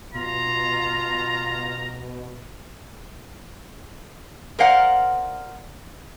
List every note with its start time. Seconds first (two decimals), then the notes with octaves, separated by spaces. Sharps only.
0.14 B2 F4 A#5
4.59 A#4 C5 D5 F5 F#5